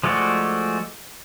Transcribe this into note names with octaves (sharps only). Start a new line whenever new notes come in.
F3 G#3 A3 F#4 D5